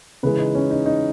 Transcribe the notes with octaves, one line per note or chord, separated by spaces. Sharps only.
C#3 E3 G#3 B4
D#4
C#4
D#4
D#4